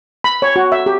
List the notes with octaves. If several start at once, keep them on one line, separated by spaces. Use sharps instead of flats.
B5
C#5
F#4
E5
G4